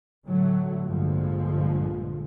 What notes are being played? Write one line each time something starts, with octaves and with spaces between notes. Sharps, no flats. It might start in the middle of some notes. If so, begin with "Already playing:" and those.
A2 D3 F#3 A3
A#1 G2 D3 F3 G#3